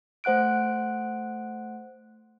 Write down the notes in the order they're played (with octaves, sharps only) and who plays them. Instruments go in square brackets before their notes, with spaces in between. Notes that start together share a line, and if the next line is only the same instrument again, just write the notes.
[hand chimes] A3 C5 F#5 F#6 D7